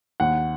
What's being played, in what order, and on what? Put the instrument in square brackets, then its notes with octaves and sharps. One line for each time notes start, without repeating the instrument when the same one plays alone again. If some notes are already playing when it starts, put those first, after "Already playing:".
[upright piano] D#2 F#5